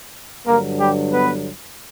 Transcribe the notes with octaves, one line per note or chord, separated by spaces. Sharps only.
G2 D3 F#3 A#3 A#4
G3 G4
B3 B4